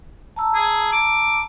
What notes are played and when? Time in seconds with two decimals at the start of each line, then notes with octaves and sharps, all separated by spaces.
0.36 A5 A#5 E6
0.54 G#4
0.92 D6